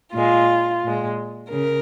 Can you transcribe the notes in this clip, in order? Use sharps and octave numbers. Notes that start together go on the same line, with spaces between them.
A#2 G#3 F4
A#2 G#3
C#3 A#4